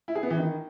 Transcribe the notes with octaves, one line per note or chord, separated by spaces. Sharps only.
E4
G#4
B3
E3
D#3